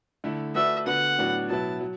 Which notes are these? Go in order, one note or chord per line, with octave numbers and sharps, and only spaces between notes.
D3 A3 E4
A3 F#4 B4 D5 E5
D3 B3 F#4 B4 F#5
A2 F#3 B3 D4 F#4
B2 F#3 B3 E4 A5
F#3